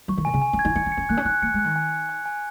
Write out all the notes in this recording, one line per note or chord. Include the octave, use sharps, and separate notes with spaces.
F#3 C#6
D#3
A#2 G#5
C#3
G#5
C#4
G#6
D#4
D#4 C#7
C#4
C#7
C#4
A#3 F#6
C#4
D#4 F#6
A#3 C#7
G#3
F#6
D#3
G#5
C#7
G#5
G#5